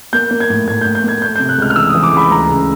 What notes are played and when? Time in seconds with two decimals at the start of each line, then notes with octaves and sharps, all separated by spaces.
0.13 A#3 G6
0.31 A#3
0.40 G#6
0.50 A2
0.68 A2 G#6
0.81 A2 G6
0.95 G6
1.04 A#3 G#6
1.22 A3 G6
1.36 C3 G6
1.49 F#6
1.58 C#2 F6
1.70 F6
1.76 E3 E6
1.89 D#6
1.94 E3
2.03 D6
2.12 C#2 B5
2.31 D2 A#5
2.49 C#3